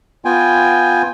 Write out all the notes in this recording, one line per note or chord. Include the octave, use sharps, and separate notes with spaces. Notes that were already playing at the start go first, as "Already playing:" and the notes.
B3 F4 G5 G#5